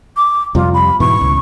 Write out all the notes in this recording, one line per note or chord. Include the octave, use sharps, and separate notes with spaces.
D6
F2 C3 G3 F4
B5
G#2 B2 E3 C#6
C#2